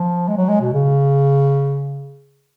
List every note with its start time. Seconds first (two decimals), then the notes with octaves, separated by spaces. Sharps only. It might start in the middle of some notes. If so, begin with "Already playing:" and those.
Already playing: F3
0.28 G#3
0.37 F#3
0.49 G#3
0.61 B2
0.73 C#3